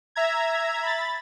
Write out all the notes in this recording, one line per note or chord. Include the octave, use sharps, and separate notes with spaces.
E5 A#5 G#6
B5 A6